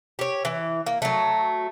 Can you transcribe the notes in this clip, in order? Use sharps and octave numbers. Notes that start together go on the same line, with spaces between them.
G4 C#5
E3
A#3
F#3 A3